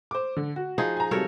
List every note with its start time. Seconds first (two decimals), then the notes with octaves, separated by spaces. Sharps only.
0.11 C5 D6
0.37 D3
0.56 F#4
0.78 F3 D#4 G#4
0.97 G#5 A#5
1.11 C3 F#3 G3 A4 A#4 C#5